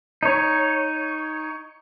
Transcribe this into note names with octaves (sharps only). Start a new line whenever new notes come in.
D#4 C#5